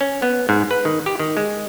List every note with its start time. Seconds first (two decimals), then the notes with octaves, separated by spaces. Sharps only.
0.01 C#4
0.22 B3
0.49 G#2
0.71 B4
0.85 D#3
1.06 G4
1.19 D#3
1.37 G#3